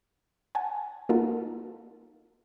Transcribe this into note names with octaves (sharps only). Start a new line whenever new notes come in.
F#5 G#5 A5
A#3 D#4 F4 F#4 A4 A#4